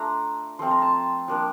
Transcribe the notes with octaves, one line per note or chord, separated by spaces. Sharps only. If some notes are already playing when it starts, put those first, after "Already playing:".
Already playing: A3 D4 F4 A#5
F3 A3 C4 F4 C6
A#5
A5
F3 A#3 D4